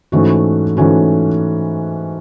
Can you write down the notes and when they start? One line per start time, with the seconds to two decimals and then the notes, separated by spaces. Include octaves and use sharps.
0.12 G#2 E3 A3 C#4 F#4
0.77 G#2 E3 A3 C#4 F#4